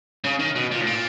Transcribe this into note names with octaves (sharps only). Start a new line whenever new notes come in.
C#3
D#3
B2
A#2
A2
A#2